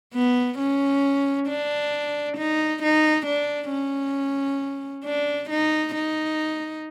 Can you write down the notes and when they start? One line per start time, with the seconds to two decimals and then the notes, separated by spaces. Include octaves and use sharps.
0.14 B3
0.59 C#4
1.48 D4
2.37 D#4
2.83 D#4
3.26 D4
3.71 C#4
5.05 D4
5.50 D#4
5.95 D#4